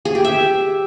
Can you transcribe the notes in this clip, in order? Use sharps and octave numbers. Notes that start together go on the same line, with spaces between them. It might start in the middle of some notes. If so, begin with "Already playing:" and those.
G#4
G4
E5